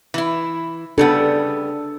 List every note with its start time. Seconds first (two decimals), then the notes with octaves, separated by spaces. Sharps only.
0.14 E3 E4
0.98 C#3 G3 B3 D4 A4